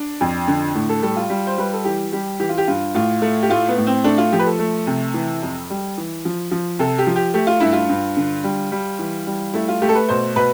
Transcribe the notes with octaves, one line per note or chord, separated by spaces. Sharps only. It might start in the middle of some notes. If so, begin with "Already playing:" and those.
Already playing: D4
F2
D3
A2
A4
G3 A4
F4
G3
C5
G3 B4
A4
E3 G4
G3 G4
E3 G4
F4
G4
G2 F4
A2 F4
A3
G4
A2 F4
B3
A2
C4
A3 D4
F4
F3 G4
B4
A4
A3
C3
E3
F2
G3
E3
F3
F3
C3 A4
G4
F3
G4
A3 G4
F4
G2 E4
F4
G2
D3
G3
G3
E3
G3
A3 E4
F4
A3 G4
A4
B4
B2 C5
B2 B4